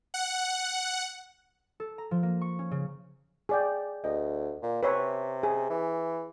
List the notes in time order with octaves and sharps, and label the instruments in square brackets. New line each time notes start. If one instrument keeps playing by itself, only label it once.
[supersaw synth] F#5
[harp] A4
A#5
F3
A#3
C#6
C#4
C#3
[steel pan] G#4 D5 G5
[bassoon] D2 [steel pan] D#5
[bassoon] A#2
[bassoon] C3 [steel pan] B4 C#5 E5
[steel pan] G#4
[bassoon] E3